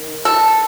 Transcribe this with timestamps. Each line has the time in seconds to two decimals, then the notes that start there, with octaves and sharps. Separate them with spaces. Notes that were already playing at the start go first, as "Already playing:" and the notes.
Already playing: D#3
0.25 A4